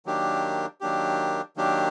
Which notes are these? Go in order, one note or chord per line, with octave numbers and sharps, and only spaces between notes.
D#3 F#3 A#3 D4 G4
D#3 F#3 A#3 D4 G4
D#3 F#3 A#3 D4 G4